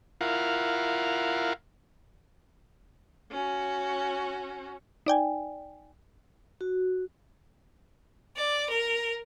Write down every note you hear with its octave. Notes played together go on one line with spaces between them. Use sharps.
E4 F4 A#4 F5 F#5
C#4 F#4
D#4 D5 G5 G#5
F#4
D5
A#4